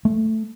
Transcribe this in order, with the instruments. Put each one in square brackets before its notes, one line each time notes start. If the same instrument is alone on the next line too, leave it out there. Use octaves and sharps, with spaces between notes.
[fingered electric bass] A3